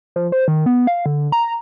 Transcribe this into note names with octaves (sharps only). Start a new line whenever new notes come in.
F3
C5
D#3
B3
F5
D3
A#5